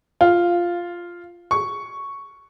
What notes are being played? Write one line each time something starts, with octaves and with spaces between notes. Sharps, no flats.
F4
C#6